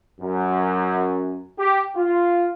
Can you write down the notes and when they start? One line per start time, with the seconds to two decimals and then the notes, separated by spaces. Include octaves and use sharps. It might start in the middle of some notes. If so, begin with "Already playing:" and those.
0.21 F#2
1.59 G4
1.96 F4